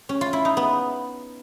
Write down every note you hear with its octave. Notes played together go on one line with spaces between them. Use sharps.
C#4
F4
E4
D#4
B3